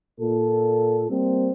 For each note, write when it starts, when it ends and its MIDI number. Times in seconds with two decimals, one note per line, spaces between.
0.21 1.06 46
0.21 1.06 69
1.10 1.52 55
1.10 1.52 58
1.10 1.52 60